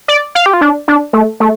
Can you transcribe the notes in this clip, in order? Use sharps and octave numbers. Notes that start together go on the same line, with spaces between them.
D5
F5
G4
F4
D4
D4
A3
A3